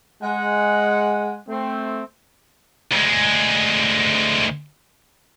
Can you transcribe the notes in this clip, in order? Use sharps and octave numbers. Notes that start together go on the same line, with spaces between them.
G#3 F#5
A3 C4
D2 G#3